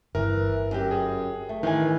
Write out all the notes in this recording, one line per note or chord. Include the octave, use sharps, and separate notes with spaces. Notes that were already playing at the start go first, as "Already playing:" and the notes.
G1 E3 A#4
F#2 G4
G#4
A3
D#3 E3 G#5